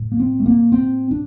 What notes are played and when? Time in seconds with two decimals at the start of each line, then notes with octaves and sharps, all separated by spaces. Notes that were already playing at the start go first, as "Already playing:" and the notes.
Already playing: A2
0.12 A#3
0.20 C4
0.40 A3
0.46 A#3
0.72 C4
1.11 D4